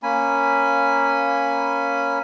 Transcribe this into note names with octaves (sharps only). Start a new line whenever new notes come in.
A#3 C#4 G#5 B5